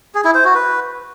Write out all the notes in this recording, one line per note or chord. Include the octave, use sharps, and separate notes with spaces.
G#4
E4
C5
F#4
B4